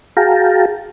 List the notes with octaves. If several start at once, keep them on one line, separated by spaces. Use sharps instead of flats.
F#4 G#4 F5 G5 A5 A#5